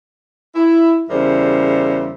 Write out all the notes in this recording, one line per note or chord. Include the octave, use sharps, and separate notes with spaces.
E4
E2 C#3 G3 A#4 C5 E5